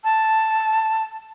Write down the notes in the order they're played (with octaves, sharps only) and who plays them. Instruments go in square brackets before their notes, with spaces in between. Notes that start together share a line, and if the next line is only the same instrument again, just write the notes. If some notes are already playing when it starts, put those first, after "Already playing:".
[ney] A5